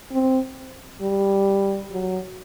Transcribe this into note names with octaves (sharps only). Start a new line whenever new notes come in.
C4
G3
F#3